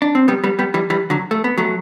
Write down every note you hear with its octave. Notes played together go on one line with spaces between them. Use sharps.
D4
C4
G3 B3
G3 B3
G3 B3
E3 G3
E3 G3
D3 F#3
A3
B3
F#3 A3